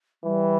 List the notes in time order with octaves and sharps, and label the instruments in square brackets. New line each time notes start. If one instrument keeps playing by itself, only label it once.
[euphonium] E3 [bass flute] G3